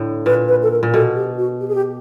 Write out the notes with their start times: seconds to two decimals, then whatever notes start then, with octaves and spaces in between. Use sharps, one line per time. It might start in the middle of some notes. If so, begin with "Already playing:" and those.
Already playing: A2 D3
0.26 A#2 B4
0.48 B4
0.63 A4
0.71 A#4
0.83 A#2
0.93 B2 A4
1.15 G4
1.38 F#4
1.60 G4
1.68 G#4
1.75 G4